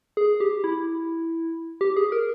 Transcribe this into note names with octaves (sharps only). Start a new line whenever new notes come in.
G#4
G4
E4
G4
G#4
A#4